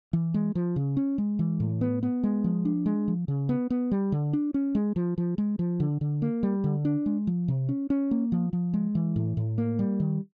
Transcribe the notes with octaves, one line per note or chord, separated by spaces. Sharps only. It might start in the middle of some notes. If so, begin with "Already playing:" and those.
E3
G#3
F3
C#3
C#4
G#3
E3
A2
B3
B3
G#3
F3
D4
G#3
F3
C#3
B3
B3
G3
D3
D4
C#4
G#3
F3
F3
G#3
F3
D3
D3
A#3
G3
D3
D4
G#3
F3
C3
C#4
C#4
A#3
F3
F3
G#3
E3
A2
A2
A#3
G3
D#3